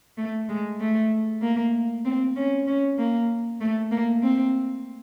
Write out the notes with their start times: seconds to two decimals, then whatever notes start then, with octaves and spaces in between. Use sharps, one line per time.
0.18 A3
0.49 G#3
0.80 A3
1.42 A#3
2.05 C4
2.36 C#4
2.67 C#4
2.98 A#3
3.61 A3
3.91 A#3
4.22 C4